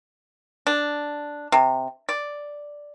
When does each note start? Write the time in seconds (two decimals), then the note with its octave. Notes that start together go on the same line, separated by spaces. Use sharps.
0.67 D4
1.52 C3
2.09 D5